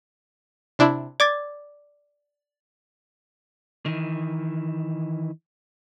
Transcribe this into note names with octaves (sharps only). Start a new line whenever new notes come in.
C3 D4 E4
D5 D6 A6 D7
D#3 E3